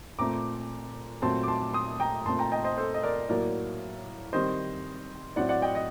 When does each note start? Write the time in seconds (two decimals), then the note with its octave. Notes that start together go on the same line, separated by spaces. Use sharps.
0.19 A#2 A3 C4 A#5 D6
1.22 A#2 F#3 A3 C4 A5 C6
1.43 D6
1.48 A5 C6
1.74 C6 D#6
2.00 G5 A#5
2.26 A#2 A3 C4 A5 C6
2.39 G5 A#5
2.52 D#5 G5
2.64 C5 D#5
2.77 A4 C5
2.94 D#5
3.03 A#4 D5
3.29 A2 F#3 A#3 A#4 D5
4.33 D#3 G3 C4 C5 D#5
5.36 A2 F#3 C4 D5 F#5
5.49 D5 F#5
5.62 D#5 G5
5.75 D#5